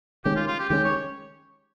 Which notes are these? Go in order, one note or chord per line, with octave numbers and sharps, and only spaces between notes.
D#3 G#3 C#4 G4
F4
F4
G4
D#3 G#3 C#4 G4
C#5